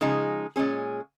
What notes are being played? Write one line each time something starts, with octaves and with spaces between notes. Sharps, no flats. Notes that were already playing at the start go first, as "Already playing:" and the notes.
C#3 F3 G#3 D#4 G#4
A#2 G#3 C#4 G#4